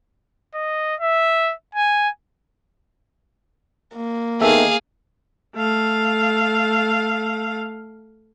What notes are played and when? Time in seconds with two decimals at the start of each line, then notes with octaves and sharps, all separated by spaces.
0.54 D#5
1.00 E5
1.75 G#5
3.95 A#3
4.41 D#3 B3 G#4 A4 E5 F5
5.56 A3 F5